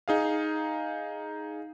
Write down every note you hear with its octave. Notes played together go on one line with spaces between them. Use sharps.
D#4 G#4 F5